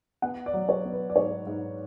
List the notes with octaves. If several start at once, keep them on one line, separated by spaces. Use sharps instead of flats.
B3 F#5
D5
F#3
C#5
B3
B4
D5
G#2 C#5
G#2